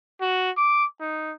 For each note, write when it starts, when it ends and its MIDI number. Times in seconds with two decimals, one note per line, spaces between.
0.21 0.51 66
0.57 0.85 86
1.01 1.33 63